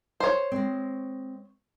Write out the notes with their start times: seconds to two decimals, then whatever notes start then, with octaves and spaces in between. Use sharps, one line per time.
0.20 C5 C#5
0.52 G#3 C4